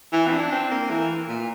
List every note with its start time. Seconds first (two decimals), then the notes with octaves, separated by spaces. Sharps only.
0.13 E3
0.27 C4
0.32 D4
0.51 C4
0.71 A#3
0.91 E3
1.28 A#2